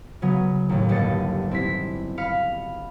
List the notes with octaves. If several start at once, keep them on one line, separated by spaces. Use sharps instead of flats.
C#3 F#3 B3
D#2 A2
G1 G2 A#3 D#5 A6 C#7
C4 E4 B6
F5 B5 F6 C#7